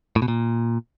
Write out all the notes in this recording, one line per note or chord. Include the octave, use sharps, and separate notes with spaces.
A2
B2
A#2